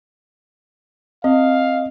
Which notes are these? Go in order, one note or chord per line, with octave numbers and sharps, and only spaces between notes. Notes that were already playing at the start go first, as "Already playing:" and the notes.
C4 D#5 F5